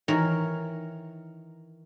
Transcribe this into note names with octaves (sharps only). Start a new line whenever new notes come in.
D#3 E3 A#4 C#5 A#5